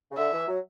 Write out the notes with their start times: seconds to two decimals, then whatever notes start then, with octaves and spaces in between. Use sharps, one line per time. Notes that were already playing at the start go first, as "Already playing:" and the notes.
0.11 C#3
0.17 D3 E5
0.33 E3
0.48 F#3